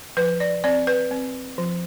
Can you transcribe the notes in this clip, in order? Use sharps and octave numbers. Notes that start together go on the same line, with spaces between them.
F3 B4
D5
C4 D5
B4
C4
F3